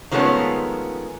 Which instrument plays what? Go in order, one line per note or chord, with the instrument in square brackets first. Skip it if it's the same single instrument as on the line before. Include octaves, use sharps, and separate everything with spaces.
[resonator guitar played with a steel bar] D#3 F3 G#3 A3 B3 C#4